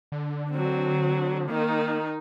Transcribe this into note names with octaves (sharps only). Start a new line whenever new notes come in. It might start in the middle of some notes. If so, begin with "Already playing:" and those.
D3
F#3 C4
D#3 A#3 D#4